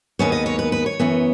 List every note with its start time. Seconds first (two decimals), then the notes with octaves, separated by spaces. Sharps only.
0.19 D#2 C#3 G#3 B3 C#5
0.32 D#5
0.46 C#5
0.59 B4
0.72 B4
0.86 C#5
1.00 F#2 E3 B3